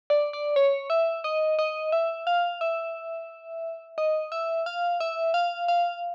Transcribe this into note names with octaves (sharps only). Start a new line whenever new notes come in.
D5
D5
C#5
E5
D#5
D#5
E5
F5
E5
D#5
E5
F5
E5
F5
F5